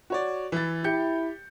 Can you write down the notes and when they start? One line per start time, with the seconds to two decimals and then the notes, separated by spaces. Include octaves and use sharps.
0.10 F#4 C#5 D5
0.52 E3 A6
0.84 E4 G4 G6 C#7